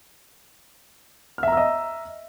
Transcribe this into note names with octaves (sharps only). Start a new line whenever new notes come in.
D#5 E5 A#5 E6 F6